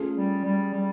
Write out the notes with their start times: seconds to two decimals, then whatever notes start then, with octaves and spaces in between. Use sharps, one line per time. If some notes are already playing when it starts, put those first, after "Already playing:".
Already playing: A3 C#4 F4 G#4
0.16 G3
0.44 G3
0.73 G3